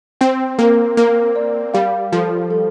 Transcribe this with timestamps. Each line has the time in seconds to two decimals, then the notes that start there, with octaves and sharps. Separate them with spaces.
0.21 C4 G5
0.59 A#3 A#4
0.97 A#3 A#4
1.36 D5
1.74 G3 F5
2.12 F3 A4
2.50 A4